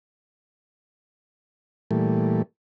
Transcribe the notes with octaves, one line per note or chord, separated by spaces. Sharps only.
A#2 E3 G3 A3